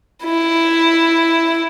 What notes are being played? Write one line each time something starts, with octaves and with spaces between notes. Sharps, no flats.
E4